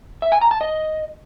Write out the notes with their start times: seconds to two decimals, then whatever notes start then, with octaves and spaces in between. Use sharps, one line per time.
0.22 E5
0.32 G#5
0.41 A#5
0.51 A5
0.61 D#5